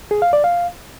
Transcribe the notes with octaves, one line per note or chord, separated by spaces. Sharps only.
G#4
F5
D5
F5